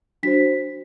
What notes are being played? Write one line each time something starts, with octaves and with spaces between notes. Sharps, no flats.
D4 F#4 C5 B6